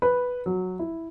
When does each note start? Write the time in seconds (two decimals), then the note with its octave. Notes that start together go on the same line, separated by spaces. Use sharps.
0.02 B4
0.46 F#3
0.79 E4